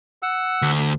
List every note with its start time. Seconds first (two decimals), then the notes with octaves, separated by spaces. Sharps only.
0.22 F#5 E6
0.62 D2